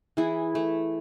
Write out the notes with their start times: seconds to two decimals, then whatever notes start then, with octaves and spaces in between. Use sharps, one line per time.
0.17 E3 E4 G#4
0.55 A3